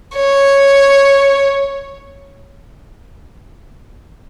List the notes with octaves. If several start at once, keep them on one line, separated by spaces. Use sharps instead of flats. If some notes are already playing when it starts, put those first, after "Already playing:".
C#5